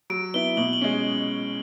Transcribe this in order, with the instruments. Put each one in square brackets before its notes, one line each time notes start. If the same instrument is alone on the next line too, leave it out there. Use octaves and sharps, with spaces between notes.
[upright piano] F#3 [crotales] D7
[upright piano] B3 E4 [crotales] G7
[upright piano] B2 [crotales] F#7
[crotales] F#7
[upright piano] G#3 C#4